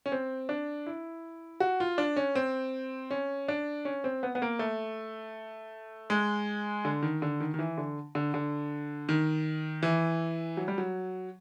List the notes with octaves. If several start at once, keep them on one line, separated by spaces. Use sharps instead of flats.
C#4
C4
D4
E4
F#4
F4
D4
C#4
C4
C#4
D4
C#4
C4
B3
B3
A#3
A3
G#3
D3
D#3
D3
D#3
D#3
E3
D3
D3
D3
D#3
E3
F#3
G3
F#3